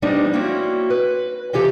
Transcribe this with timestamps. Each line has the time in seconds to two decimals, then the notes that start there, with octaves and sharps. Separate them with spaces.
0.02 F3 G3 B3 C4 D4 D#4
0.33 A#3 C4 C#4 E4 F#4
0.90 B4
1.53 C3 E3 F4 G4 A4